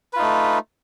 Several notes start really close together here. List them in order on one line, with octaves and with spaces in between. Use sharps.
B4 F4 D#4 A3